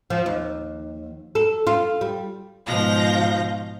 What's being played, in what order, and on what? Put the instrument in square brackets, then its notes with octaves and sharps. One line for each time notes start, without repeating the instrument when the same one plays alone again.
[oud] F3
D#2
A4
F4
G3
[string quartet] G#2 B2 F3 F5 G6 A#6